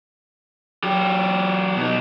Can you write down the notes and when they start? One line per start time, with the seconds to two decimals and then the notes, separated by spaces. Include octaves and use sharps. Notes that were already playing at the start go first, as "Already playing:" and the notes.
0.84 F#3 G4
1.77 B2 D#4